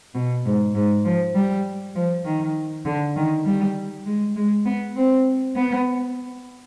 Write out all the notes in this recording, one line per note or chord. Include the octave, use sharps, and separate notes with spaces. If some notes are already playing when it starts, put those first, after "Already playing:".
B2
G#2
G#2
F3
G3
F3
D#3
D3
D#3
G3
G#3
G#3
B3
C4
B3